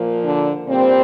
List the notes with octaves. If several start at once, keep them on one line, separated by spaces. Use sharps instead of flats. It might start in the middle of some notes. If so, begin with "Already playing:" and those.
Already playing: A#2 F3 A#3
D3 D4
A#2 G3 C4